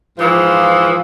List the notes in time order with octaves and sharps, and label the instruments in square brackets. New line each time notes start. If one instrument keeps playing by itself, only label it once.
[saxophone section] G#2 E3 F3